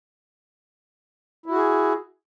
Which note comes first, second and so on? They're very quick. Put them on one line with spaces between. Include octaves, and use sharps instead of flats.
E4 F#4 G#4